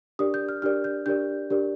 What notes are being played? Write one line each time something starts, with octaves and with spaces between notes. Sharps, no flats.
D4 G4 A#4 D5 D#6
G6
F6
D4 G4 A#4 D5 F6
G6
D4 G4 A#4 D5 G6
D4 G4 A#4 D5